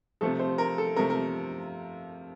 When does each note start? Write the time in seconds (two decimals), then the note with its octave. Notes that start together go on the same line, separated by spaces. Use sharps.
0.21 C3 F3 A3 A4
0.39 C5
0.58 A#4
0.78 A4
0.96 C3 F3 A3 A#4
1.10 A#4